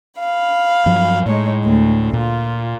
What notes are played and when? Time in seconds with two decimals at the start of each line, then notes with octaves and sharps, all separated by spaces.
0.18 F5 B5
0.86 G2 F3 F#3
1.26 A2 G#3 D#4 C#5
1.63 D2
2.13 A#2 F4